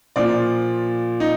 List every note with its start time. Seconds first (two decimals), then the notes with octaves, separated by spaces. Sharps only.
0.16 A#2 F3 D5
1.20 D#4